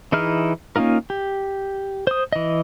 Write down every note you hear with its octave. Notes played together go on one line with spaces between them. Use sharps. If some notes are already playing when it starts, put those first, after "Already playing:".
E3 D#4 E4 G#4 F6
A#3 C#4 D#4 F4 A#4
G4
C5 D#6
E3 D#5